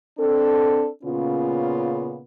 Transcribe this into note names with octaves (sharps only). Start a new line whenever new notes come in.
C4 D4 A4
A#2 C#3 B3 C#4 F4